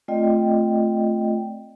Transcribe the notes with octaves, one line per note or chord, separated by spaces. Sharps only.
A3 C4 F4 D5 D#5 G5